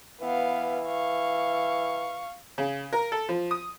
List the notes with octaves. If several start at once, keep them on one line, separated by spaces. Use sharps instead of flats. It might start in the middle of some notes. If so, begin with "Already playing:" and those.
E3 B3 F5
F5 C#6
C#3
A#4
A4
F3
D#6